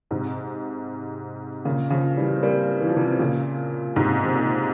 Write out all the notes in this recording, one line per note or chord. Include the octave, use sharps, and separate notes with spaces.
G#2 C3
A#2 C#3
C#3 F3
E3 G3
C4
G3 A#3
E3
F3
C3 E3
A#2 C#3
G#2 C3
C3
A#2